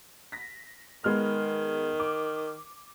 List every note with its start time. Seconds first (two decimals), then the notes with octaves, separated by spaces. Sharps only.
0.32 A#6 B6
1.04 D#3 G#3 B3 F6
2.00 D6